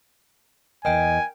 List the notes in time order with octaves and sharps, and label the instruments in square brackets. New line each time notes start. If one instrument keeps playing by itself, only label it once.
[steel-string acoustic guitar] E2 D#5 [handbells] A#4 G5 [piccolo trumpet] G#5